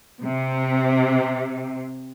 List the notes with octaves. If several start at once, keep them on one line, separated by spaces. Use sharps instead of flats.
C3